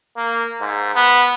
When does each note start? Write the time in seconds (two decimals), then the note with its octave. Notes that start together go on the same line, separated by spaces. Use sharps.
0.17 A#3
0.61 G#2
0.96 B3